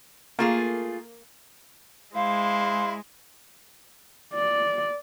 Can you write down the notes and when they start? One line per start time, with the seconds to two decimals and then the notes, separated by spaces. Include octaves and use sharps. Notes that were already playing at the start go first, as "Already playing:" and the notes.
0.39 A3 A#3 F4 G#4
2.15 G#3 E4 C5 F5
4.34 D5